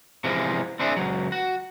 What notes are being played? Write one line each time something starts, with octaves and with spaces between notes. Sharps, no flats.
C3 E3 F3 G#3
C4 D4 G#4 E5
C#2 F#3
F#4